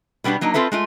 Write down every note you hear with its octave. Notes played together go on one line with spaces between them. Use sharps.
B2 G3 B3 D4 G4
F#3 A#3 D4 D#4
C4 F4 A4 B4 E5
G#3 A3 F4